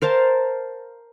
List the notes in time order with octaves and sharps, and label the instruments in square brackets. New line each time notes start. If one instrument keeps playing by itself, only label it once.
[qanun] A#4 C5 F5 A5